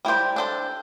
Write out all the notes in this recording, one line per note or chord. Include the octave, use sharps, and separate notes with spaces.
G3 E4 G4 C5
D4 A4 C5